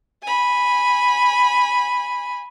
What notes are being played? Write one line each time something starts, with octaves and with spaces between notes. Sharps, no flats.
G#5 B5